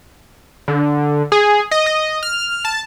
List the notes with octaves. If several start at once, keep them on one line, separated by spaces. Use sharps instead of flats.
D3
G#4
D#5
D#5
F6
A5